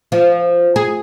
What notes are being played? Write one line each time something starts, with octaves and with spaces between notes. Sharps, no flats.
F3
G#4